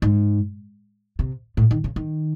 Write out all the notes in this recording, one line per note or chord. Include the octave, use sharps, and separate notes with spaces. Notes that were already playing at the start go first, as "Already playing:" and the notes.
G#2
C3
A2
D#3
C#3
D#3